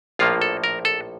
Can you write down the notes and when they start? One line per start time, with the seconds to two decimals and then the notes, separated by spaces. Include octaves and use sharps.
0.19 A#1 A2 F3 A#3 F4
0.42 A4
0.64 A#4
0.85 A4